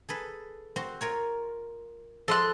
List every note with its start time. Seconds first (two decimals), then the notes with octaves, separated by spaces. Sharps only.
0.09 G#4 A4 B4
0.76 C4 F#4 C5
1.01 F4 A#4 C#5
2.28 F3 A4 D#5 C6 F#6